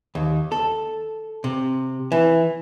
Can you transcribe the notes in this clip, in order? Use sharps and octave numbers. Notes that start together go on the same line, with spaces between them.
D#2
A4
C3
E3